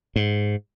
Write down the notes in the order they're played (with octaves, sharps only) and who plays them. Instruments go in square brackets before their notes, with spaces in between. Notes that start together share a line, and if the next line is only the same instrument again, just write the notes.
[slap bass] G#2